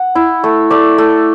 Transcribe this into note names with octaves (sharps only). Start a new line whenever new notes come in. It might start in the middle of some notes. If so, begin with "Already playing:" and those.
Already playing: F#5
E4
A3
A3 D5
A3